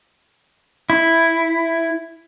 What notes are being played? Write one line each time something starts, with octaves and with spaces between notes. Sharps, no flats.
E4